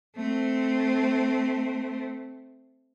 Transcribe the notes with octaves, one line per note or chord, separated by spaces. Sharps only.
A3 C4